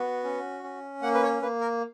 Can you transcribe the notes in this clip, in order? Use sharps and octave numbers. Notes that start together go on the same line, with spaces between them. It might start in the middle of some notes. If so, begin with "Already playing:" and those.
Already playing: B3 F#4
C#4
C#4
A#3 F#5
B4
C#5
A#3 B4
A#4